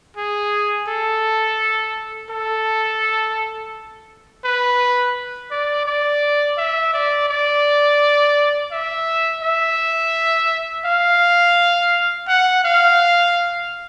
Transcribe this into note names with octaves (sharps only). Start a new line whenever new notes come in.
G#4
A4
A4
B4
D5
D5
E5
D5
D5
E5
E5
F5
F#5
F5